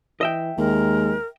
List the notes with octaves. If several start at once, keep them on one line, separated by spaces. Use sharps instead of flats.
E3 D#5 E5 G5
D#2 G#3 A#4